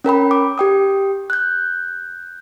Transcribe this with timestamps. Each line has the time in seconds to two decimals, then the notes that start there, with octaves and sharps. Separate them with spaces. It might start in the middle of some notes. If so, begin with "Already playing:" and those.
0.04 C#4 A#4 G5 B5
0.31 D6
0.58 G4 G5 D#6
1.30 F#6 G6